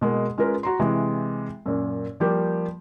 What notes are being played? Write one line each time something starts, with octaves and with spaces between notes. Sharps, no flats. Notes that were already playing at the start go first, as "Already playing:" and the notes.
B2 G#3 A#3
G#3 C#4 F4 A#4 B4
F#4 A#5 C6
C3 E3 G#3
F#2 A#2
F3 G3 A#3 G4